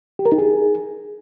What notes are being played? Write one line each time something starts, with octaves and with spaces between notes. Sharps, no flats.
G4
A#4
D#4
G#4